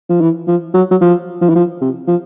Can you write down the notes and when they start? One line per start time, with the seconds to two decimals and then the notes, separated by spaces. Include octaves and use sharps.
0.09 F3
0.21 E3
0.48 F3
0.74 F#3
0.91 F#3
1.01 F3
1.42 F3
1.49 E3
1.55 F3
1.81 C3
2.07 F3